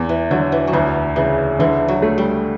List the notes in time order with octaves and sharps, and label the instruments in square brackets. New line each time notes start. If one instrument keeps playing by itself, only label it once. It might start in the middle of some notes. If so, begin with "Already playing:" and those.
Already playing: [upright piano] E2
[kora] E3
[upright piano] D3 [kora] F#3
[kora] E3
F#3
[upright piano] D2 [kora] E3
[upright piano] C#3 [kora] E3
[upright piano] D3 [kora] E3
[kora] F#3
[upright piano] A3
[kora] G3